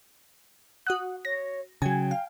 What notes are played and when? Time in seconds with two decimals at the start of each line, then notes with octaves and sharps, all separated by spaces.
0.87 F#4 F#5 D#6 F#6
1.25 C#5 A#6
1.82 C#3 F#3 G5 G#5 G#6
2.11 F5